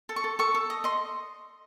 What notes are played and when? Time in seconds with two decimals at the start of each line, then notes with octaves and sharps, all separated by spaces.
0.09 A4
0.16 C#6
0.24 A4
0.39 A4 C#6
0.54 A4
0.70 D#5
0.84 D#5 C6